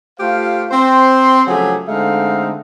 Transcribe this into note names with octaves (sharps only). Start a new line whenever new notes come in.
A3 F4 G4 C5 F5
C4 C5 C6
C#3 F3 F#3 A3 G4 G#4
D3 G#3 A3 C4 D#4 F5